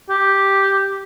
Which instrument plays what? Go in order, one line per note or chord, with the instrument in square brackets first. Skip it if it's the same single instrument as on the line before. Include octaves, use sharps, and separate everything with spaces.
[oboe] G4